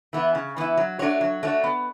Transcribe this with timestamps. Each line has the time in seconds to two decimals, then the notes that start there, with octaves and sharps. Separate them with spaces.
0.13 E3 B3 E4
0.35 C#3
0.56 E3 B3 E4
0.77 F#3
0.99 A3 D4 F#4 C#5
1.21 F#3
1.43 A3 D4 F#4 C#5
1.64 B3